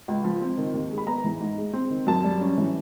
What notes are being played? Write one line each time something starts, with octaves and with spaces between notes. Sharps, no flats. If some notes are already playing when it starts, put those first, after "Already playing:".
C#2
F3
C4
D#3
D#2
G#3
B5
B3 A#5
E3
G#2
G#3
C4
D#3
F#2 A5
G3
C#4
E3